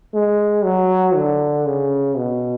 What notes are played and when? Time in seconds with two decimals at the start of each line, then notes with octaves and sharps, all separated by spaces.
0.14 G#3
0.64 F#3
1.16 D3
1.66 C#3
2.17 B2